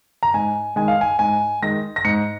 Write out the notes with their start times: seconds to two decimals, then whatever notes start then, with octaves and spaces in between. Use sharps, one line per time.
0.23 A#5
0.34 G#2 G#5
0.76 D#3 G#3 G#5
0.88 F5
1.01 G#5
1.19 G#2 G#5
1.62 D#3 G#3 A#6
1.96 A#6
2.05 G#2 C#7